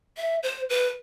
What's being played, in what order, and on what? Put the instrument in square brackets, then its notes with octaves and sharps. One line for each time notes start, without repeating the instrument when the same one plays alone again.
[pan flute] E5
C5
B4